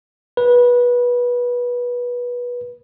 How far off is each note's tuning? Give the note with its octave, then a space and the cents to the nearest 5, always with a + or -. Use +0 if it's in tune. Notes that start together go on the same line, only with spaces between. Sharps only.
B4 -20